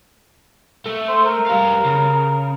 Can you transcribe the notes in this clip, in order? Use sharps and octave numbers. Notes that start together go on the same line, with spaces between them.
A3
C5
A#4
G3 F5
C#3